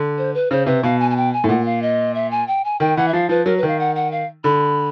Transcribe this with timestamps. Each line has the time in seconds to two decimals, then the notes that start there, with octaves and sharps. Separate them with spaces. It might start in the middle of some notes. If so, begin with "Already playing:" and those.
Already playing: D3
0.18 C5
0.34 B4
0.51 C#3 C5
0.66 C3 B4
0.83 B2 F5
1.00 G#5
1.11 G#5
1.17 G5
1.33 G#5
1.44 A2
1.49 A#2 F#5
1.65 F5
1.82 D#5
2.15 E5
2.31 G#5
2.48 G5
2.65 G#5
2.80 D#3 G5
2.97 E3 F#5
3.08 E5
3.13 F3 F5
3.29 F3 B4
3.46 F#3 A#4
3.58 B4
3.63 D#3 F5
3.79 F#5
3.96 F#5
4.12 F5
4.44 D3 B5